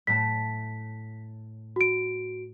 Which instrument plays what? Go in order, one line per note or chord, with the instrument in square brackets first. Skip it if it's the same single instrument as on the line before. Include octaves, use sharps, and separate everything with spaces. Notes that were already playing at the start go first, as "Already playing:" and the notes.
[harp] A2 A3 A5 [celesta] B6
[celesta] F#4 D7